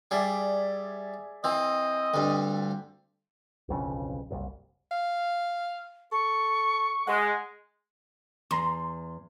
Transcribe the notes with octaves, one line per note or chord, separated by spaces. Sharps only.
G3 G#4 D5 E5
E3 C4 D#5
D2 G2
D1 B1 F2 C#3
F#1 C2
F5
A4 C#6
G#3 F#5
E2 A#5 C6